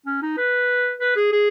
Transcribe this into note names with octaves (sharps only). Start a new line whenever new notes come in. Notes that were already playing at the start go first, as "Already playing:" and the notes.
C#4
D#4
B4
B4
G#4
G#4